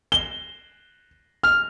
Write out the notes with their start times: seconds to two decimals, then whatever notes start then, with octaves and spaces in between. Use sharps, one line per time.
0.12 G7
1.43 F6